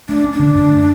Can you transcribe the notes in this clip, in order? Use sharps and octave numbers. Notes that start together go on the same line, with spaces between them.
A3 D4
C#4
D4
D3
F#2
A3